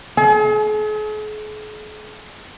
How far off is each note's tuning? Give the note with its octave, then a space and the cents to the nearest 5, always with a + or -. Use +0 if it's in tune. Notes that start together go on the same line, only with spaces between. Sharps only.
G#4 +45